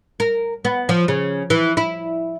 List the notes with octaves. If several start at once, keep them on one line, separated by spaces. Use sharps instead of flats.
A#4
B3
F3
C#3
E3
E4